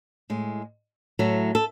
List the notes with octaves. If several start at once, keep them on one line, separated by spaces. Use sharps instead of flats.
A2 G#3
A2 F#3 A3
A4